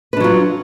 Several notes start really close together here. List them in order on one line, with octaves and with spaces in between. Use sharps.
B4 D4 F#3 F4